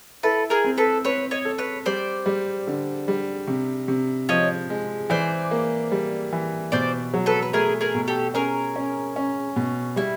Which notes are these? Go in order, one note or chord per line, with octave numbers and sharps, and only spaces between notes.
E4 A4 B4
G#4 A#4
C4
A4 B4
C4 B4 C#5
C#5 D#5
A4
B4 C#5
G3 C5 D5
G3
D3
G3
C3
C3
F3 C#5 D#5
G#3
E3 C5 D5
A#3
G3
E3
B2 C5 D5
F#3
A4 B4
B4
A3 G#4 A#4
G#4 A#4
B2
G4 A4
C#4 G#4 A#4
C#4
C#4
B2
G3 E4